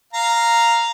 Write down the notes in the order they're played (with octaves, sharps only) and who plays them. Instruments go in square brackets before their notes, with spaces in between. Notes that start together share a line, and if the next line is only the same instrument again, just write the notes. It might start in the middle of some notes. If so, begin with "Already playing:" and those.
[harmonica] F5 A#5